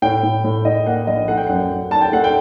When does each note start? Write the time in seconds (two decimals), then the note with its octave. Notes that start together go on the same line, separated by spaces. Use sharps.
0.02 A2 G5
0.23 A2
0.44 A2
0.65 A2 D#5
0.86 A#3 F#5
1.07 A#1 D#5
1.28 A3 F#5
1.37 G5
1.47 F#2 F#5
1.70 F#2
1.91 A3 A5
2.01 G5
2.12 A3 F#5
2.24 G5